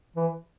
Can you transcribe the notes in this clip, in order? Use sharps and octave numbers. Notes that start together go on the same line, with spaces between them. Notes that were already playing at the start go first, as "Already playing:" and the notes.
E3